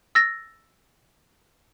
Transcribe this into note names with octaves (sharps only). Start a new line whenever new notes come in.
E6 A6 A#6